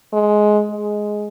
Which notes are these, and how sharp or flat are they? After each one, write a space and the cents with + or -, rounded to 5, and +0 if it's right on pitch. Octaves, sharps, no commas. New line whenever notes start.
G#3 +15
G#3 +5